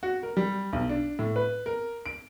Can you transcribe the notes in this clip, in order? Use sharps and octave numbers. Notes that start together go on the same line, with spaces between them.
F#4
A#4
G3
B1
D4
A2
B4
A#4
D7